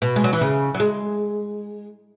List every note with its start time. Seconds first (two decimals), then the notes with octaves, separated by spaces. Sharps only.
0.02 B2
0.16 G#3
0.24 F#3
0.33 E3
0.41 C#3
0.74 F#3
0.80 G#3